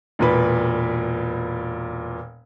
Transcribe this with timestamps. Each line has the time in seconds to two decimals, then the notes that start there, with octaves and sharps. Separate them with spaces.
0.19 E1 A#2 B4